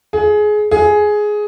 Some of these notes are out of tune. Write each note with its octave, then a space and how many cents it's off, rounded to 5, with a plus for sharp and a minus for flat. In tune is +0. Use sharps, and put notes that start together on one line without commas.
G#4 +20
G#4 +10